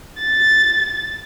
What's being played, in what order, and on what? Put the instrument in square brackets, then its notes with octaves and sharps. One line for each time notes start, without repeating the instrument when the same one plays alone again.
[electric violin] A6